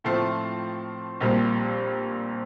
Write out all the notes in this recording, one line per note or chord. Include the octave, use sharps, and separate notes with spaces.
A2 F3 A3 C4 F4
A#1 A#2 G3 C4